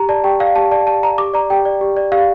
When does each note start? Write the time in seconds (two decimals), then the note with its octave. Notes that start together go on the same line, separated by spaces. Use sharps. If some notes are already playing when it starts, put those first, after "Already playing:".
Already playing: G4 A#5
0.09 D5 A5
0.24 G4 G5
0.40 D5 F5
0.56 G4 A5
0.71 D5 A5
0.87 G4 A5
1.03 D5 A#5
1.18 G4 D6
1.34 D5 A#5
1.50 G4 G5
1.65 D5
1.81 G4
1.97 D5
2.12 G4 F5